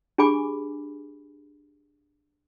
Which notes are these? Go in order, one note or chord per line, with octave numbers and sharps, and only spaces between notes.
D4 G4 G#4 G#5 B5 D6